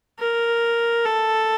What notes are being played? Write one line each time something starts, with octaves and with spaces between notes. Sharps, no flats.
A#4
A4